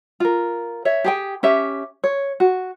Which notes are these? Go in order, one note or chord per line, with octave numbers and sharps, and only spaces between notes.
F4 A#4
C#5 E5
G4 G#4 G5
C#4 G4 E5
C#5
F#4